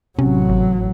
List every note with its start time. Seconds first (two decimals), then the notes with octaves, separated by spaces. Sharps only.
0.19 A1 C3 F#3 C#4
0.49 G#1